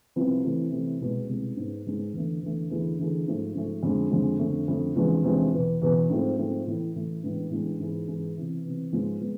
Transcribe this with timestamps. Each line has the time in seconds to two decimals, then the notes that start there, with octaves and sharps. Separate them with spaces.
0.16 C2 C3 F3 B3 F4
0.44 C3 E3 A3 E4
0.72 C3 E3 A3 E4
1.00 C2 B2 G#3
1.29 C2 B2 G#3
1.57 G#2 G#3 B3
1.85 G#2 G#3 B3
2.13 E2 D3 A3
2.42 E2 D3 A3
2.70 E2 D3 A3 E4 G#4
2.99 E2 D3 A3 E4 G#4
3.27 G#2 F3 A3
3.55 G#2 F3 A3
3.83 F2 D3 G#3
4.11 F2 D3 G#3
4.39 F2 D3 A3
4.68 F2 D3 A3
4.96 E2 C3 F3 G#3 D4
5.24 E2 C3 F3 G#3 D4
5.52 E2 B2 B3
5.82 E2 B2 B3
6.09 G#2 F3 A3 C4 F4
6.37 G#2 F3 A3 C4 F4
6.66 A2 E3 A3 E4
6.95 A2 E3 A3 E4
7.23 A2 E3 G#3 B3 D4
7.50 A2 E3 G#3 B3 D4
7.80 G#2 E3 B3 E4 G#4
8.07 G#2 E3 B3 E4 G#4
8.36 C3 E3 B3
8.64 C3 E3 B3
8.92 G#2 F3 G#3 B3
9.21 G#3 B3